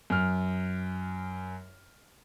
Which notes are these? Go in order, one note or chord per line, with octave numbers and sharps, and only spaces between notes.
F#2 F6